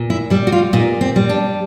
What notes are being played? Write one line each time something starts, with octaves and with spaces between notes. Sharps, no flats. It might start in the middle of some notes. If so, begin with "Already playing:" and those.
Already playing: A#2
E4
G3 E4
F#4
F4
A#2 D#4
C4
G3
D4